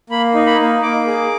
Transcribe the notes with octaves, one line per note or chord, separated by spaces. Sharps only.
A#3 B5
D#4
B5
A#3
A#3 D6
G#4